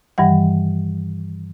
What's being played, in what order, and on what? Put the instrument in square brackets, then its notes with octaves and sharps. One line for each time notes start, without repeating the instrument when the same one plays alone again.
[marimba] G2 D#3 E3 G3 F#5